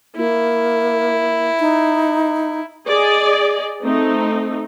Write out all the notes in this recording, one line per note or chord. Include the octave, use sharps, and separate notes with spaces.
A#3 E4
D#4
G#4 D5 D#5
A3 C4 D#4